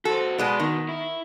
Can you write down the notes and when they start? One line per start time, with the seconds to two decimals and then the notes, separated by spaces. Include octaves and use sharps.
0.05 F#4 A4 C5
0.38 B2 G#3 B3 D5
0.60 B2 D#3
0.89 E4